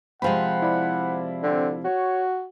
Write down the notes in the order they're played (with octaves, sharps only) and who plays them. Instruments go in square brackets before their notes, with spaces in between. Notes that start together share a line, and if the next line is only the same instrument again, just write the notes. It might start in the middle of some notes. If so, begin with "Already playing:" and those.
[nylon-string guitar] C3 F3 G#3 [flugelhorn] F#5 [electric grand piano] G5 B5
[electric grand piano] E4 D5 B5
[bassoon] D3 [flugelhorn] C4
[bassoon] F#4 [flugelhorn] C#5